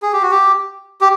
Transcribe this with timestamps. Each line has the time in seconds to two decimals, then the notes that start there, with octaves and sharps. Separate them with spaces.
0.02 G#4
0.13 G4
0.22 F#4
0.31 G4
1.01 G4